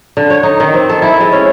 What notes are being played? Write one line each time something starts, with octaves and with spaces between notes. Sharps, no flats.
D3
C#5
D#4
D#3
C4
A4
E4
G#3
C#4